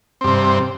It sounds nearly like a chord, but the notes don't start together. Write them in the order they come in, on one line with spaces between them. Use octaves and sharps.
C4 G2 C3